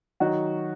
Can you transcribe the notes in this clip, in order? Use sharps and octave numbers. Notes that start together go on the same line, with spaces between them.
D#3 F#3 D#4 F#4